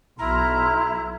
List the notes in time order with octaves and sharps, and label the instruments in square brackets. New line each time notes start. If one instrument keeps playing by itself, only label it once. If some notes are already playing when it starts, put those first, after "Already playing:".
[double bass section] B1 [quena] E4 [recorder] A#5 [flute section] C6 F6